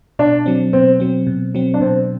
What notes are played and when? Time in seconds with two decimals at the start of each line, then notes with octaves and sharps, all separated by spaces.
0.19 B2 D4
0.46 F#3 C4
0.73 B2 C4
1.00 F#3 C4
1.27 B2
1.55 F#3 C4
1.74 D4
1.80 B2 C4